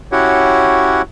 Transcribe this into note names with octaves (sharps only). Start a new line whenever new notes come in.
C#4 E4 F#4 G4 C#5 F#5